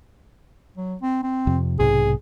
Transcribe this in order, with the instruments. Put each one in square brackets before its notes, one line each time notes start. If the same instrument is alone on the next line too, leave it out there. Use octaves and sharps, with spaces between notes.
[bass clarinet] F#3
C4
C4
[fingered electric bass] F2 C3
[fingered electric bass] B1 G#2 C3 [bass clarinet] G#4